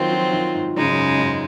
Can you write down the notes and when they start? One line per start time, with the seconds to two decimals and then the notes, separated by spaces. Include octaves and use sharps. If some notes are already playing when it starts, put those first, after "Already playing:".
Already playing: D#3 F3 F#3 C4 F4
0.12 F3
0.32 D#3
0.55 G#2
0.76 F#2 C#3 G#3 D#4
0.84 G#2
0.90 F#2
1.19 G#2